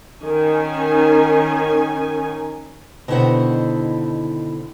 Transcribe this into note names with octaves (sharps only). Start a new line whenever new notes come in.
D#3 C#4 G#5
B2 D3 D#3 E4 C5 F#5